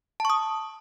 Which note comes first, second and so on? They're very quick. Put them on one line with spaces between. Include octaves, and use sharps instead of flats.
A5 C#6 D#6